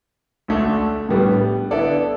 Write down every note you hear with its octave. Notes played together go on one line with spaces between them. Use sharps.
D2 D3 A3 D4
A2 G3 B3 D4
D3 B3 E4 A4 D5